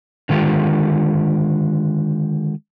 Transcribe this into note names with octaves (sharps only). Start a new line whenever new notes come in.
D3 D#3 G#3 A3 F4 G4